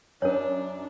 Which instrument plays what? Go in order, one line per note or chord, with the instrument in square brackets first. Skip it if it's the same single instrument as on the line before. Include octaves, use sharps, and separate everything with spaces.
[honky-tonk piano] F#2 [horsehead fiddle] D4 [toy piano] A#4 C#5